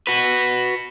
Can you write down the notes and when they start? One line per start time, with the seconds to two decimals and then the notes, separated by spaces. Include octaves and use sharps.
0.07 F#4 B4